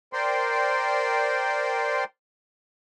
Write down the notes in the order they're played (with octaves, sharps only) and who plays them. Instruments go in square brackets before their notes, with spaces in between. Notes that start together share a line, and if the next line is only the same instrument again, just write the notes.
[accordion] A#4 C5 D5 G5 C6